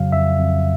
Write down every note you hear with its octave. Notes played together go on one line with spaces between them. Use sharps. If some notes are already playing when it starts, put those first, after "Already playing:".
Already playing: F2 C#3 F#3 F5
F2 E5
F2